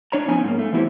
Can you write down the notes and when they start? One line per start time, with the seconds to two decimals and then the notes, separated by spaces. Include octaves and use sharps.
0.12 D4 C#5 A#5
0.28 F3 B3 C#4 D#4 G#5
0.44 G#2 A3 A#3
0.59 A3
0.73 E3 B3 E4 F#4 G4 C5